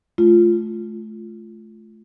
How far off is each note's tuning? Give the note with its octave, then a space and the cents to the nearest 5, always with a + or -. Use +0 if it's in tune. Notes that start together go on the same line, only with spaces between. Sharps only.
A3 -25 F4 -10